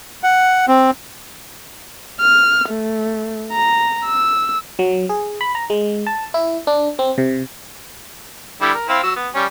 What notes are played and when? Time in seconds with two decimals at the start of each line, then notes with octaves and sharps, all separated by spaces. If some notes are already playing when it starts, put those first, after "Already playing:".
0.23 F#5
0.68 C4
2.21 F6
2.70 A3
3.52 A#5
4.05 E6
4.79 F#3
5.09 G#4
5.41 B5
5.55 A#5
5.70 G#3
6.07 A5
6.34 E4
6.67 D4
6.99 C4
7.18 C3
8.61 D3 G3 E4
8.74 A#4
8.89 C4 E4 F5
9.03 F#3 E6
9.16 B3
9.35 G3 C#4